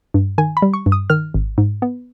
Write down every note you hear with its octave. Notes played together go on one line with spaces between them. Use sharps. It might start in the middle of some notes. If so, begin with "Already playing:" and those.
G2
D#3 G#5
B5
G3
C#6
G2
D#6
D#3 F6
G#1
G#2
B3